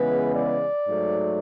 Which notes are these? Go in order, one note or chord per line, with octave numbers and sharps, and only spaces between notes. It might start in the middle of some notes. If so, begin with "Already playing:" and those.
Already playing: C#3 E3 G#3 B3 B4
D5
G#2 F#3 A3